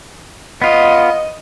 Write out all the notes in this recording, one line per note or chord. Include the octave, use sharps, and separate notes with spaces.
B3 F4 D#5